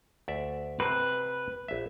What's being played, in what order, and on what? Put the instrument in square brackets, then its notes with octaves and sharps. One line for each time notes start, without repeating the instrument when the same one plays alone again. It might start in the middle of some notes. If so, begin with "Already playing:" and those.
[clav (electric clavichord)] D2 D5 E5
[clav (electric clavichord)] C3 F#4 C5 [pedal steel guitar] B4
[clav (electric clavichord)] A#1 E5